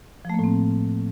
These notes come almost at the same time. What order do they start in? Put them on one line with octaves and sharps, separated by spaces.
F3 A3 A#3 A2 C4